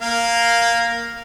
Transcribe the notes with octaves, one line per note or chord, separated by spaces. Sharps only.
A#3 A#4 F5